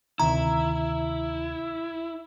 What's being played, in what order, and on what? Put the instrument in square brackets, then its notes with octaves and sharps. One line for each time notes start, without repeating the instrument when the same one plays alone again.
[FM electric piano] D2 C3 D#3 [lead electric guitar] E4 [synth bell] A#5